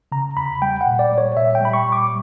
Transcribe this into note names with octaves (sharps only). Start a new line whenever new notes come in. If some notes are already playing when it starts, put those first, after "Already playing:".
C#3 A#5
E2 B5
G3 G5
F#5
A#2
D5
G3
C#5
A#2 E5
G5
G3 B5
C#6
A#2
D6